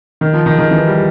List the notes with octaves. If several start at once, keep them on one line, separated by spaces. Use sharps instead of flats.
D#3
F3
D#3
D#3
E3
G3